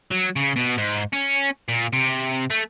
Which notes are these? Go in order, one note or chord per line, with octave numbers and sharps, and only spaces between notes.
F#3
C#3
B2
G#2
C#4
A#2
C3
A3